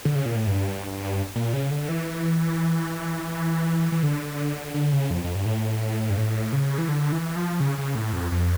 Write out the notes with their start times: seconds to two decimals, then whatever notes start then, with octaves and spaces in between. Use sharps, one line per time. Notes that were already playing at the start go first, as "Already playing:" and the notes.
0.05 D3
0.16 C#3
0.26 A#2
0.36 A2
0.47 G2
1.36 A#2
1.53 C#3
1.71 D3
1.89 E3
3.92 E3
4.03 D3
4.74 D3
4.93 C#3
5.11 F2
5.24 F2
5.35 G2
5.46 A2
6.10 G2
6.17 A2
6.53 C#3
6.78 E3
6.88 D3
7.12 E3
7.36 F3
7.60 C#3
7.78 C#3
7.95 A2
8.13 F2
8.32 F2